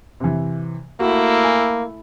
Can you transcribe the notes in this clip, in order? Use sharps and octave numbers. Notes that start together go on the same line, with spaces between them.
C3 E3
A3 A#3 E4 F#4
G#5